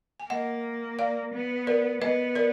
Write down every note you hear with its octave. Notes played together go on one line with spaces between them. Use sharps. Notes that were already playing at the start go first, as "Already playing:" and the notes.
G#5
A#3 D#5 F#5
D5 F5
B3
A#4 D5
B3 B4 D#5
A#4 D5